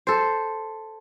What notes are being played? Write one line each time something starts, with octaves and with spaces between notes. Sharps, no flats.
A4 C5